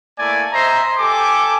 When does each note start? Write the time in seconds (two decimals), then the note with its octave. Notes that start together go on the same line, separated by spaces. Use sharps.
0.18 A3 A#3 E4 D5 G#5
0.53 C5 D#5 E5 A#5 C6
0.97 G4 A4 G#5 D6